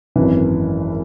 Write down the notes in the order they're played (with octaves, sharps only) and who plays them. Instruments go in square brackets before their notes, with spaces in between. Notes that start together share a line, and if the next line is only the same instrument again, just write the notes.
[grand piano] G#1 F#2 E3